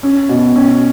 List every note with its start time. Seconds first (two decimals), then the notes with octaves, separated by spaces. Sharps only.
0.03 C#4
0.29 B2
0.56 C#4